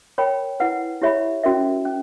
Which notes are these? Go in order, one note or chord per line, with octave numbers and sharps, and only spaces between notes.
A#4 C#5 G5 B5
E4 B4 F#5
E4 G4 C#5 E5 B5
C#4 F#4 A#4 E5
C#4